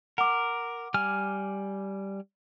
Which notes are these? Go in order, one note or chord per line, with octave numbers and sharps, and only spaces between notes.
A#4 F#5 D6
G3 G#5 F6